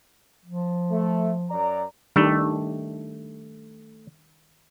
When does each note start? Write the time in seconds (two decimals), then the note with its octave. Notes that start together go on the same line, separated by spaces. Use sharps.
0.45 F3
0.90 A3
1.50 F#2 D5 A#5
2.16 D#3 G3 A3 D4